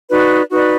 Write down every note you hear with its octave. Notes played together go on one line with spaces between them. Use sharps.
D#4 F#4 B4 D5
D#4 F#4 B4 D5